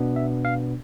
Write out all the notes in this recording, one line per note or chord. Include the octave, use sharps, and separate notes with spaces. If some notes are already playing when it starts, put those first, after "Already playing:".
Already playing: B2 B3 D4
E5
F5